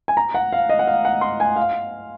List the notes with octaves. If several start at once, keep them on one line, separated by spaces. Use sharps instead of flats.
G#5
A#5
F#5
F5
D#5
F#5
F5
F#5
C6
G#5
F5